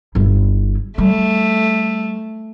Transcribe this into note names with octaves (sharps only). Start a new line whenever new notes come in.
G1 E4
G3 A3